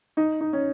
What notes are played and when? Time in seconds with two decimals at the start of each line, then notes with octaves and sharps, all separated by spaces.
0.17 D#4
0.41 D#4
0.53 C#4